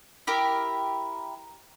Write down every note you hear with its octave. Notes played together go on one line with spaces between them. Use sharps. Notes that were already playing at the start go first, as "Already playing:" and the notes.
E4 G4 A#4